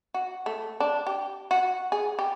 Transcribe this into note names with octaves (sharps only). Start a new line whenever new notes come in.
F#4
A3
D4
G4
F#4
G#4
G4